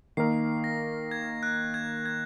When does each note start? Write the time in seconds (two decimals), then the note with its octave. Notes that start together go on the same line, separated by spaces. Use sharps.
0.17 D#3 A#3 D#4 A#4 C7
0.64 A#6
1.11 G#6
1.43 F#6
1.74 G#6
2.05 G#6